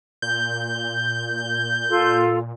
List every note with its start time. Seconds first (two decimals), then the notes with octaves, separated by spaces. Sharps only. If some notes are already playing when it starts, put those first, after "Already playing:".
0.22 A#2 G6
1.89 F4 A4